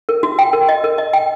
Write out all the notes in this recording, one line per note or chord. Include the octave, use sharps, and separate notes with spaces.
A#4
F#4
G5
A#4
D#5
A#4
D#5
G5